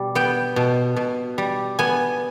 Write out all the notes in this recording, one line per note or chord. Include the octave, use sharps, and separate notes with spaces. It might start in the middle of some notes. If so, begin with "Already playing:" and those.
Already playing: B2 G3
B3 G5
B2
B2
G3
B3 G#5